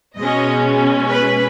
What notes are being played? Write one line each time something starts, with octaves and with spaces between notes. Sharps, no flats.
B2 G#3 C#4 D#5
B4